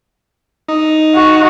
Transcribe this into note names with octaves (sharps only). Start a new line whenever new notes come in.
D#4
F#4